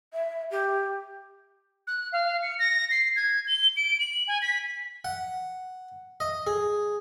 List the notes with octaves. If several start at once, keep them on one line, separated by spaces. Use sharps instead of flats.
E5
G4
F#6
F5
C#7
A#6
C7
G#6
G7
D7
F#7
G#5
B6
F#5
D#5
G#4